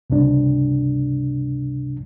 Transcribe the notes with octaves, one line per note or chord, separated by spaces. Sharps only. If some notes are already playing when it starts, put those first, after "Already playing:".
C#2 G2 C3 D4